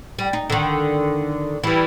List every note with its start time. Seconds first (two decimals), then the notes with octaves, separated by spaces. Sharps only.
0.19 G3
0.33 D#4
0.50 D3 D#3
1.64 E3 G3